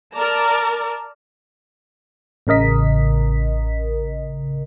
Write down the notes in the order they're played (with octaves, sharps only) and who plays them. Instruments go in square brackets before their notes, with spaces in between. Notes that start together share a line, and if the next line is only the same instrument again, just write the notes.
[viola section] A#4 D5 A5 A#5
[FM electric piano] A1 C#3 A#4 D#5 B6